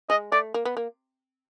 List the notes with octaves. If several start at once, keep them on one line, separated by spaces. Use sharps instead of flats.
G#3 D#5
A3 D5
A#3
B3
A#3